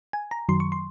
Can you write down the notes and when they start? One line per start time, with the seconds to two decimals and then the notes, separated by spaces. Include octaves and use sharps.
0.13 G#5
0.31 A#5
0.49 F#2 D#3 F#3 C6
0.60 C#6
0.72 C6